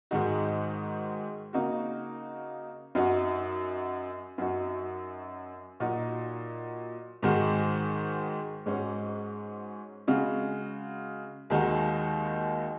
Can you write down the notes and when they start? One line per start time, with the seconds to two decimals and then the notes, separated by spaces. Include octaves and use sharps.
0.11 G#2 D#3 G#3 D#4 F#4
1.53 C#3 A#3 D#4 F#4
2.95 F#2 F#3 D#4 F#4
4.38 F#2 F#3 D#4 F#4
5.80 A#2 F#3 D#4 F#4
7.23 G#2 D#3 G#3 F#4
8.66 G#2 G#3 C#4 F#4
10.08 C#3 G#3 F#4
11.50 D#2 D#3 G#3 D#4 F#4